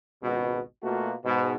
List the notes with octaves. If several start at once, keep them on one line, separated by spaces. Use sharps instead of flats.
G#1 C#2 B2
B2 A3 A#3 F4 F#4
G#2 B2